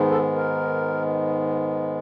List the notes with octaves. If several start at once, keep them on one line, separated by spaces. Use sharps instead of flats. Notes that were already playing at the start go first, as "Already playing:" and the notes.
Already playing: G#2 D#3 G#3 B3
A4
A#4